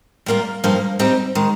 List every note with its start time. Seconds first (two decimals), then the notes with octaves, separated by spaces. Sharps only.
0.26 G3 A#3 F4 A#4
0.64 G2 F3 A#3
0.99 G3 C4 D#4 G4
1.35 D#3 G#3